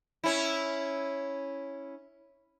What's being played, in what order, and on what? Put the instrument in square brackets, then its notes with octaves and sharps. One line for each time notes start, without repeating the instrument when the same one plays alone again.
[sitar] C#4 E4